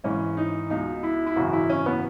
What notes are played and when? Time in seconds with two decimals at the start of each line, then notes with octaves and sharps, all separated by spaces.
0.04 G#1 G#2 E3 C#4
0.37 D#4
0.70 C#2 B2 D#4
1.03 E4
1.26 E4
1.36 G#1 F#2 C#3 E3 F#4
1.53 E4
1.70 C#4
1.86 B3